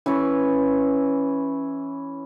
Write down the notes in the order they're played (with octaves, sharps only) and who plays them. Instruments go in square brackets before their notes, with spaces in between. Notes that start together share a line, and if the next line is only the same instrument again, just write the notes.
[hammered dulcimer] E3 C#4 B4 C#5